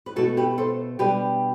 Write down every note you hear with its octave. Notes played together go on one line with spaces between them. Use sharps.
B4
B2 A3 E4 F#4 A4
G4 B4
A4 C5
B2 G3 D4 G4 B4